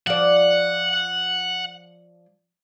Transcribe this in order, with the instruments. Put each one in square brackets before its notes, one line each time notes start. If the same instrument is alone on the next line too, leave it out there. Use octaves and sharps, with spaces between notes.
[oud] F3 D5 [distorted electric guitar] F#5